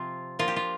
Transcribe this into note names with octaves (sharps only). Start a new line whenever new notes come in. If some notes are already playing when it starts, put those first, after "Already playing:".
Already playing: C3 F3 C4 F4
F3 A#3 D4 F4
G4
F4